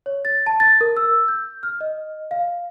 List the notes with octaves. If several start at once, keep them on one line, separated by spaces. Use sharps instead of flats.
C#5
A6
A5
A6
A#4
E6
G6
F6
D#5
F5